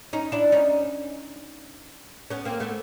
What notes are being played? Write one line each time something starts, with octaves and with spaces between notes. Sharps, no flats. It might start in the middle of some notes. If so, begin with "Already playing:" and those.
C#4 D#4
D4 E4
C#4 D#4
B3 C#4
A#3 C4
A3 B3